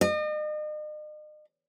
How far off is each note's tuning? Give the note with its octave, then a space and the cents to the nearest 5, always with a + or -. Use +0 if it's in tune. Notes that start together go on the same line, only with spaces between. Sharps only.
D#5 -40